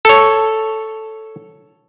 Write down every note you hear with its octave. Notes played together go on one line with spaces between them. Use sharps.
A4 C#5